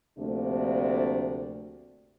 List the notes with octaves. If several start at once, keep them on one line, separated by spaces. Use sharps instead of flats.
D2 C3 F3 A3 A#3 D4